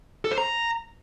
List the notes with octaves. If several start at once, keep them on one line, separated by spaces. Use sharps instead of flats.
A4
C5
A#5